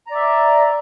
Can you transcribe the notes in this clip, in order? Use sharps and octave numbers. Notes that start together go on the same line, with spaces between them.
D5 E5 A#5